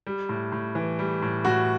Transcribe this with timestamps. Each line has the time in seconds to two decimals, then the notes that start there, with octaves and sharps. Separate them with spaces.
0.07 G3
0.29 A2
0.52 A2
0.75 E3
0.99 G3
1.22 A2
1.45 A2 F#4